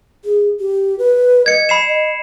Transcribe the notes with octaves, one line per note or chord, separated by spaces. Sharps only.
G#4
G4
B4
D#5 G#6 C#7
B5 C7 E7
D#5